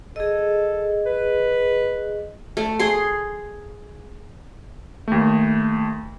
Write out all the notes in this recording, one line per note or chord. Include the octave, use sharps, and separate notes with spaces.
G#4 A4 D#5
B4
A3
G#4 C6
D#2 A3